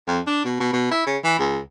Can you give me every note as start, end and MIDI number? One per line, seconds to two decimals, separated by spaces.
0.07 0.19 41
0.27 0.44 62
0.44 0.60 47
0.60 0.69 47
0.73 0.89 47
0.91 1.05 64
1.06 1.17 49
1.24 1.35 52
1.39 1.59 37